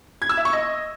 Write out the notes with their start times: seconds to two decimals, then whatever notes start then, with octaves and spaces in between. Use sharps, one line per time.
0.22 G#6
0.29 E6
0.37 E5
0.45 C#6
0.53 D#5